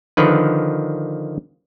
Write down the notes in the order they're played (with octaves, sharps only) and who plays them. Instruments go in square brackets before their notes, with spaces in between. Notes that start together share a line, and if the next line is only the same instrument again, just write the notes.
[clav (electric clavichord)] D3 D#3 F3 B4